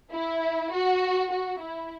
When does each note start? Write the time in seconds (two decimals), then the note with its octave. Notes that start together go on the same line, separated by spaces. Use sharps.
0.12 E4
0.72 F#4
1.30 F#4
1.60 E4